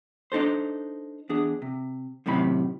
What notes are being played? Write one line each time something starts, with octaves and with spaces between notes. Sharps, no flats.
D4 D#4 A4 C5
E2 D4 G#4
C3
F#2 A2 C3 D#3 B5